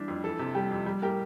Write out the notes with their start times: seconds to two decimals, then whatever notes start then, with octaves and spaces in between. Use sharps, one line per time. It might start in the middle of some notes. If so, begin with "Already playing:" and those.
Already playing: E3 G3 D4
0.08 F2
0.24 E3 A4
0.39 C3
0.55 G3 G4
0.71 F2
0.86 G3
1.02 A2 G4 A#4